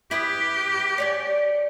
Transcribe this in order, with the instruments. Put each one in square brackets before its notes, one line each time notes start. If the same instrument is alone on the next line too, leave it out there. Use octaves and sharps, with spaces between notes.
[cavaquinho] E4 B4 D#6 [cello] G4
[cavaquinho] C#5 D5 G#5